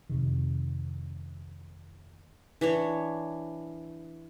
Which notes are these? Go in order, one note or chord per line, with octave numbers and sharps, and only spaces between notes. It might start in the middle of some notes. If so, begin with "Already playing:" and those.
F2 C3 D#3
E3 D4 C#5